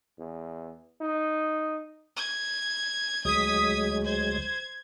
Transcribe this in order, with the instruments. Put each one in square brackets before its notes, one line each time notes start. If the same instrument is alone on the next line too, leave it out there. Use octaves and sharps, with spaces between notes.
[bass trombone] E2
D#4
[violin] G#6
[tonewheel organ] D2 F#3 G#3 [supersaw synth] D#6 B6 [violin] G#6
[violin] C5 [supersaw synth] G#6